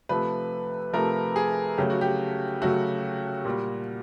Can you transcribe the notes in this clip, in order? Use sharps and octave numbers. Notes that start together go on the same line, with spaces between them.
C3 F3 A3 B4
C3 F3 A3 A#4
G#4
C#3 F#3 A3 G4
F#4
G4
C#3 F#3 A3 F#4
A#2 G3